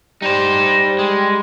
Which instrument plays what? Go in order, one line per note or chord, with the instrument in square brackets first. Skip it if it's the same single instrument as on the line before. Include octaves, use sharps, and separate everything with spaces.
[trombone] G3 [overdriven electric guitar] D#4 C5
[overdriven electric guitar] G#3